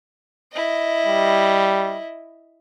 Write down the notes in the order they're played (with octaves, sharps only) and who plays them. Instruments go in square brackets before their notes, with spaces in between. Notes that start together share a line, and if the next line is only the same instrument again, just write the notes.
[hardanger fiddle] E4 D#5
[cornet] G3